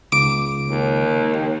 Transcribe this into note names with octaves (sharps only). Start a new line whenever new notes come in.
C#2 D6
D#2